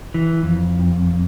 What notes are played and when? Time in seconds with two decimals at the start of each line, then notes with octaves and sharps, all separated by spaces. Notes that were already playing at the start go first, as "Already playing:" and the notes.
0.14 E3
0.43 F2